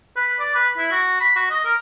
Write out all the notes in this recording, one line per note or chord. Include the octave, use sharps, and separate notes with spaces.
B4
D5
B4
E4
F#4
B5
F#4
D#5
A#4